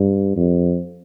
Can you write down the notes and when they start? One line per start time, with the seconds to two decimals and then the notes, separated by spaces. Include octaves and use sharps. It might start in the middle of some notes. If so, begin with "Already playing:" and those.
Already playing: G2
0.36 F2